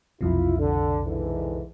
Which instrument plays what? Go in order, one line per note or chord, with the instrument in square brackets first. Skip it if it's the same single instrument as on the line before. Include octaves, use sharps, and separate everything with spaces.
[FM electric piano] B1 F2 C3 [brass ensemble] E4 F4
[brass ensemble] D3
G#2 D3 E3